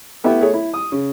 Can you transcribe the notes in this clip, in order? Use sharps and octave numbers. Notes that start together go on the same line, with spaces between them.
A3 B3 E4 G4 E5
A3 G#4 C#5
E4
D#6
C#3